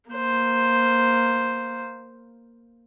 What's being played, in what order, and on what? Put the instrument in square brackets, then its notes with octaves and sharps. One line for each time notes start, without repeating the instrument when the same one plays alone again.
[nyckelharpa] A#3 C5